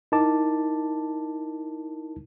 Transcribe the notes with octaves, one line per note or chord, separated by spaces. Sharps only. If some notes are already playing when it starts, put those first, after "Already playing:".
D#4 E4 A#4 A5 D6